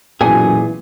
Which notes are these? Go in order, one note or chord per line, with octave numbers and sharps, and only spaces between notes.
B1 F#2 A#2 E3 B3 G#4 G#5